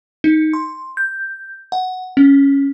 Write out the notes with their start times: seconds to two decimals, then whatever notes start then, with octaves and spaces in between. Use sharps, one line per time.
0.24 D#4
0.53 C6
0.97 G6
1.72 F#5
2.17 C#4